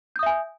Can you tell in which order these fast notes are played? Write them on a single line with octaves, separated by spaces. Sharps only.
G6 D#6 E5 G#5